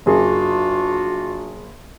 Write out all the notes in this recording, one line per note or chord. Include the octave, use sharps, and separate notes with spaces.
F#1 D4 F4 F#4 G#4